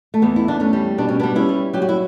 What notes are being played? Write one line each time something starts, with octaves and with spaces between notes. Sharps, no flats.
A3
E2 B3
E4
E2 D4
A3 C#4
G3
B2 D4
C#4
G3 B3 D4
C#4 E4
G3
F#3 G4
F#4
E4